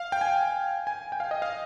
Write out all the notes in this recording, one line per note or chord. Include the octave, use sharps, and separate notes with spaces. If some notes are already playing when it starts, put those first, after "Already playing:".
Already playing: F5
G5
G#5
G#5
G5
F5
D#5
F5